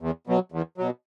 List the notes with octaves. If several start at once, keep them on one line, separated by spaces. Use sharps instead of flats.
E2
B2 F#3
E2
B2 F#3